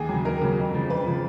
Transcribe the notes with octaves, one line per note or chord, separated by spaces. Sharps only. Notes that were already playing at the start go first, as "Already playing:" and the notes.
Already playing: D#2 G#4
C#3 F#3
D#2 A#4
C#3 F#3
F2
C#3 F3
F2 B4
C#3 F3